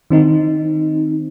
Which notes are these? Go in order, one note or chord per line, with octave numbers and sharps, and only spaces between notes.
D#3 C4 D#4